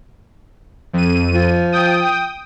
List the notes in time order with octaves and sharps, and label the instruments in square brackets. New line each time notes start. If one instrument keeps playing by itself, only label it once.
[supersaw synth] F2 D#7
[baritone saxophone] F3
[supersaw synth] G5 D#6